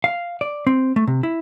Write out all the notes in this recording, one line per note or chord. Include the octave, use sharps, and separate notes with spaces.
F5
D5
C4
A3
C3
E4